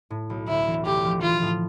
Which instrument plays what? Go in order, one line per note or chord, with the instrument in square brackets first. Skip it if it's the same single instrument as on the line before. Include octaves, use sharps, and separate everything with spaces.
[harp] A2
B1
[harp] D2 [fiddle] E4
[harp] E3
[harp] D2 [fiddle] G4
[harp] F3
[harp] E3 [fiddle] F4
[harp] A2